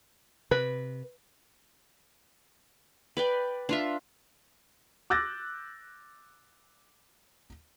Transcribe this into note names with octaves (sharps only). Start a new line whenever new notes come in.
C3 B4
B4 D5 G5
D4 F4 E5
D6 E6 F#6 G6 A6 A#6